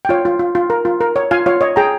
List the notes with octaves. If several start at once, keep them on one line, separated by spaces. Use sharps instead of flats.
G5
F4 C#5 F5
F4
F4
F4
A#4
F4
A#4
C#5
F4 F5 G#5
F4 C#5 F5
C#5 D#5
G#4 G5 A#5